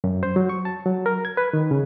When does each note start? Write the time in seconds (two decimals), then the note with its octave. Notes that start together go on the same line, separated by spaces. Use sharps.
0.04 F#2
0.23 C5
0.36 F#3
0.49 C#6
0.65 A5
0.86 F#3
1.06 A#4
1.25 G#6
1.37 B4
1.53 D#3
1.71 C#3